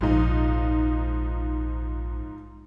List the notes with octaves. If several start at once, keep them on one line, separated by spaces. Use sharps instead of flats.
A#1 G#2 F3 D#4